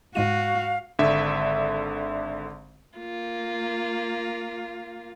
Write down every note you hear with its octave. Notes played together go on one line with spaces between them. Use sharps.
G#2 G#3 F#4 F5 D#7
G#1 D3 E5
A#3 F4